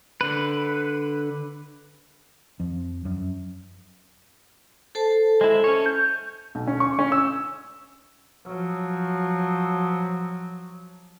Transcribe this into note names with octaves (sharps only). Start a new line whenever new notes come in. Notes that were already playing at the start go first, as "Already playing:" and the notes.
D3 B4
F2
F#2
A4 C5 A5
G#3 E4
C#4 C#5
G6
B1
C#4
C#6
C#4
E6
F3 F#3